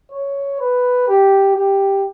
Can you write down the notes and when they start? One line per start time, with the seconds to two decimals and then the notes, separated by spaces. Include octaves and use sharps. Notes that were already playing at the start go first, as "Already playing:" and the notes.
0.12 C#5
0.61 B4
1.08 G4
1.56 G4